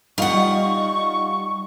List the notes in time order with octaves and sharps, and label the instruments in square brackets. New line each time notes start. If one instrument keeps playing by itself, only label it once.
[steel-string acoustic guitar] G3 F#5 [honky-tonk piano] D#4 F4 [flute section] C#6